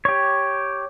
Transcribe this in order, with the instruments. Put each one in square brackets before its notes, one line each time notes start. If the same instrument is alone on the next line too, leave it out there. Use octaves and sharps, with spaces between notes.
[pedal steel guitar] G4 C#5